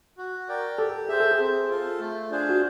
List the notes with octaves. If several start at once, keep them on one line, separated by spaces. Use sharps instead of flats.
F#4
A#4 D5 G5
G4 A4
G#4 C5 E5
A4
G#4
C4
F4 A4
A3
D4 F4 G#4 C5
F#4